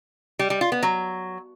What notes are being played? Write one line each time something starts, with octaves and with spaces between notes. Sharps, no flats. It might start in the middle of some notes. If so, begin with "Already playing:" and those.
G3
G3
F4
B3
F#3